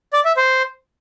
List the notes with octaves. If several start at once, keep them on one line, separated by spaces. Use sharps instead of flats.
D5
E5
C5